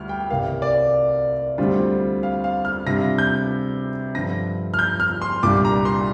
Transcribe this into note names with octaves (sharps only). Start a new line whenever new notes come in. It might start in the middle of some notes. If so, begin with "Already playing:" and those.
Already playing: D2 G3 F6
G5
C2 C3 A#3 F5
D5
D2 D3 G3 C4 F4
F5
F5
F6
C3 G3 D4 F4 A#6
G6
G2 D3 F3 A#6
F6
G6
F6
C6
C2 A#2 G3 D4 F4 D6
A#5
C6